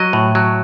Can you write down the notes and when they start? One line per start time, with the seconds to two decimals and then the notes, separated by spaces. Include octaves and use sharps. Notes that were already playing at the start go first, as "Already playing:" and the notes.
Already playing: F#3 D#5
0.13 A2
0.35 F#3